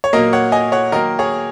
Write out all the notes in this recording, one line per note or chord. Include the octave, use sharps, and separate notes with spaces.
C#5
A#2 F#3 A#3 A#4 D#5
C#5 F#5
D#5 G#5
C#5 F#5
D#3 F#3 A#3 A#4 D#5
G#4 C#5